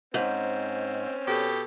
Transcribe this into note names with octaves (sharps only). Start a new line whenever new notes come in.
G#2 C4 C#4
B2 G4 A4